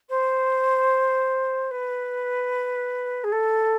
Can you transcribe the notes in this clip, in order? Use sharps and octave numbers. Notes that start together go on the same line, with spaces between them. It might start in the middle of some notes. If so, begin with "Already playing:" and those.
C5
B4
G#4
A4